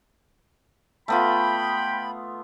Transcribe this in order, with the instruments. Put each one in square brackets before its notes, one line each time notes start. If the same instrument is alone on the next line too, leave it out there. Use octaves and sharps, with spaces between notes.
[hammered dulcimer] A3 B3 F4 [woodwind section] G5 B5